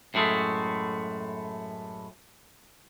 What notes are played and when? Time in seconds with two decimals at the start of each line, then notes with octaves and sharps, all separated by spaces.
0.14 F#2 A2 G#3 A3